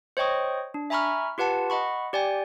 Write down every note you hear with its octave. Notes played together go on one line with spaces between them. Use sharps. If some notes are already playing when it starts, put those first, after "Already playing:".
C5 C#5 D#5 G5 C#6 D#6
D4
E5 G#5 A#5 B5 C#6 F6
F4 G4 B4 F#5 A5
D#5 F#5 B5 C#6
G4 D5 G5 G#5